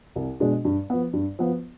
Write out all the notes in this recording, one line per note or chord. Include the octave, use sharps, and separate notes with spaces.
C2
B2 G#3 D4
G2
F3 B3
G2
F3 B3